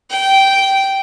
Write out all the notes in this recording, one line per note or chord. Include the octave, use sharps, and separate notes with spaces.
G5